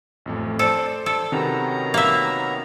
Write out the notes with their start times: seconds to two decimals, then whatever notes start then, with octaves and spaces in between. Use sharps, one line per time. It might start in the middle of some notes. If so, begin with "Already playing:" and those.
0.26 A1 F2 A3
0.59 A4 C5 D5
1.06 A4
1.32 C3 D#3 F#3 B3 C#4 A#5
1.94 A#3 E5